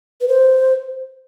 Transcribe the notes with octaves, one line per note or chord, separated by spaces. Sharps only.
B4
C5